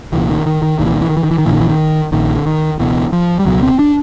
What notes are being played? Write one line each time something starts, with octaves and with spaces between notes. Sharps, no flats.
C2 A#2 E3
D#3
D#3
D#3
C2 A#2 D#3
E3
D#3
E3
D#3
E3
D#3
E3
D#3
A#1 A#2 E3
D#3
E3
D#3
A#1 A#2 D#3
D3
D#3
C#2 B2 E3
F3
G3
C#2 B2 F#3
C4
D4